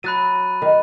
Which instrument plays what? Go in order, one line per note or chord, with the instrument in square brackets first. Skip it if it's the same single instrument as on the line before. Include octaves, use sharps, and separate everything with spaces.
[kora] F#3 [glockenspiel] B5 F#6 A6 D#7
[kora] D#3